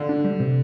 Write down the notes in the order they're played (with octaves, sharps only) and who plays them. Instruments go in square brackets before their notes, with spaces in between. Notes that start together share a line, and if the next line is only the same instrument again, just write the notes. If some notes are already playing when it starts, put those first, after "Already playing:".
Already playing: [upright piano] D3 [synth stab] F4
[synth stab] D4
G3
C3